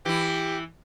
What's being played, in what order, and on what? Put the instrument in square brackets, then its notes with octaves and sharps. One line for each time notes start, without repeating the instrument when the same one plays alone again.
[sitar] E3 E4 [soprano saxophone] G4